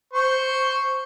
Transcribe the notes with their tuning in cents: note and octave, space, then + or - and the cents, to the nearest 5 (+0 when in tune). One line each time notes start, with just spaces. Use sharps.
C5 +0 C#6 +0